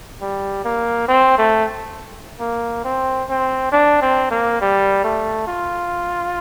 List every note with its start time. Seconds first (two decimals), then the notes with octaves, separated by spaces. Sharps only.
0.22 G3
0.65 A#3
1.08 C4
1.38 A3
2.40 A#3
2.84 C4
3.29 C4
3.72 D4
4.02 C4
4.31 A#3
4.61 G3
5.04 A3
5.48 F4